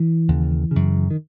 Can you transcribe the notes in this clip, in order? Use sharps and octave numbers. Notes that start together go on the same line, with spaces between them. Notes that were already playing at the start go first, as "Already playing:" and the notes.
Already playing: E3
D#2 C#3
F#2 C#3
D#3